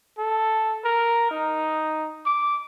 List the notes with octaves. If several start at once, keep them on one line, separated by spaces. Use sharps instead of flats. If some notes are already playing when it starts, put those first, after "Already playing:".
A4
A#4
D#4
D6